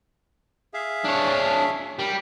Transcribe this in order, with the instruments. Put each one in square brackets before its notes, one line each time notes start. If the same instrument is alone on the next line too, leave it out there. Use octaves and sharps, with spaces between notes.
[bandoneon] G#4 E5 F5
[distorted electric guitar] D4 C#5
[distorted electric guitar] G3 [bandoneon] A#4 A#5 B5